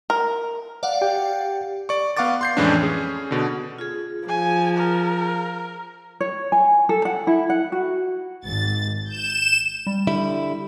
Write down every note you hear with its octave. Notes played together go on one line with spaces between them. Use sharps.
A#4
D5 F5 F#5
G4 G5
D5 C#6
B3 F5 F#5 C#6 D6 A6
C6 G6 C7
F2 A2 E3 G#3 C#4 D4
C#4 G#4
B2 D3
F4 G#4
F3 G#5
A#4
C#5
G#5
A4
F#5
E4
F#5
F#4
G#1 A6
G6 E7
G3
D3 G3 E4 B5